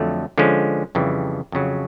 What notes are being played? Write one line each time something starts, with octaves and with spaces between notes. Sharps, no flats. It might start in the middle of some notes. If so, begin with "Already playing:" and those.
Already playing: F2 D3 F#3 A3
D3 F3 G#3 C#4
F2 C#3 E3 G3
F2 C#3 F#3